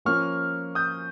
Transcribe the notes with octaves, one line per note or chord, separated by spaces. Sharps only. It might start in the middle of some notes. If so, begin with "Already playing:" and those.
F3 A#3 C#4 F4 C#6 F6
D#6 G6